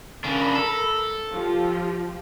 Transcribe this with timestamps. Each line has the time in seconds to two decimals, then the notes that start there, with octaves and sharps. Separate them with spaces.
0.24 C#3 D4 A#4 A#5 B5
0.55 A4
1.32 F3 F4 G4